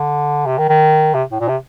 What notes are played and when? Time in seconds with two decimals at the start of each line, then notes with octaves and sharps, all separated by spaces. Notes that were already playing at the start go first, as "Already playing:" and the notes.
Already playing: D3
0.46 C3
0.58 D#3
0.69 D#3
1.14 C3
1.32 A2
1.40 A#2
1.48 C3